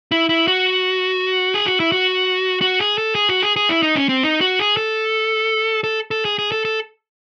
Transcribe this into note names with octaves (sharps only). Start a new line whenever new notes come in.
E4
E4
F#4
G#4
F#4
E4
F#4
F#4
G#4
A4
G#4
F#4
G#4
G#4
E4
D#4
C#4
C4
D#4
F#4
G#4
A4
A4
A4
G#4
G#4
A4
A4